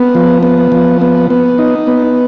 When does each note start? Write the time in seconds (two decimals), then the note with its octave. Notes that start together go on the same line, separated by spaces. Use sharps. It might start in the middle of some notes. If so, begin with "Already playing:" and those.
Already playing: B3
0.15 F3
0.43 B3
0.72 F3
1.02 B3
1.30 B3
1.58 D#4
1.87 B3